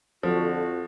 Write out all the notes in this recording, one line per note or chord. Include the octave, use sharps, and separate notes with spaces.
F2 D3 F3 F#4